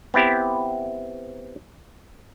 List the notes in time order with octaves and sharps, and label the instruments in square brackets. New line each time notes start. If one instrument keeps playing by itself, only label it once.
[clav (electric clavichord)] B3 C4 E4 G4